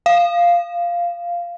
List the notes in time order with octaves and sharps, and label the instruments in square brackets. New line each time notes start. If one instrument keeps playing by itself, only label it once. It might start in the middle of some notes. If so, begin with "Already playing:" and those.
[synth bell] F5